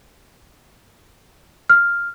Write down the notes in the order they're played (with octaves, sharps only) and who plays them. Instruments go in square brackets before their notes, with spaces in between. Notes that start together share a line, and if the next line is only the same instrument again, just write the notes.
[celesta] F6